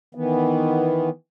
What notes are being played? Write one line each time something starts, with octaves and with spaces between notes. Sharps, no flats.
D#3 E3 B3